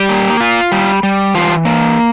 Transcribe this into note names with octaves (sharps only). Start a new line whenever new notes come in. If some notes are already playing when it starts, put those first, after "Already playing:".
Already playing: G3 G4
A#3
F4
G3
G3
E3 F4
A#3